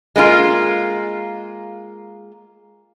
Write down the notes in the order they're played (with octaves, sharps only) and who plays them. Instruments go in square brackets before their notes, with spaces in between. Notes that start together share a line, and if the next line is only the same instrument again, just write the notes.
[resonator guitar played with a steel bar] G#3 A#3 E4 F4